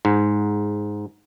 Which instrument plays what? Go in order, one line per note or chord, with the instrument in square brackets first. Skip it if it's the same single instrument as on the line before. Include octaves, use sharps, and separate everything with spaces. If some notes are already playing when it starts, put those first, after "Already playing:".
[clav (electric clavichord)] G#2